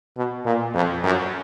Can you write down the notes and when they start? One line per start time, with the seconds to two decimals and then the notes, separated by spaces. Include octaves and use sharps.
0.17 B2
0.45 A#2
0.74 F2
1.03 F#2